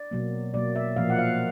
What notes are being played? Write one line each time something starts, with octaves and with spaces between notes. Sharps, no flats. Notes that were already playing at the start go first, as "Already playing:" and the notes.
Already playing: D5
B2 F#3 A#3
B2 F#3 A#3 D5
E5
A#2 F3 A#3 F5
F#5
F5